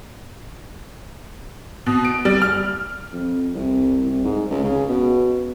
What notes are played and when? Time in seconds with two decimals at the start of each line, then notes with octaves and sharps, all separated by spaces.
1.86 B2
2.05 D7
2.25 G3
2.42 F6
3.13 F2
3.55 C2
4.05 C2
4.25 G#2
4.51 C#2
4.64 C#3
4.89 B2